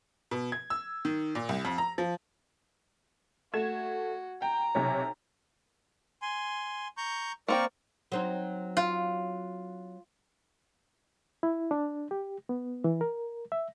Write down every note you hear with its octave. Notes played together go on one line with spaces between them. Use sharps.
B2
G#6
E6
D#3
A#2
C2
F2
A#5
F3
A3 F#4 G#6 E7
G5 A#5
B1 C3 C#5
G#5 C6
A#5 C#6 G6
A#3 C4 A#4 D5 G5 C#6
F#3 C4 D#4
F4
E4
D4
G4
B3
E3
A#4
E5